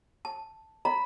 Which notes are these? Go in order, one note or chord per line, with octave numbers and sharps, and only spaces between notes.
A5
A#5 B5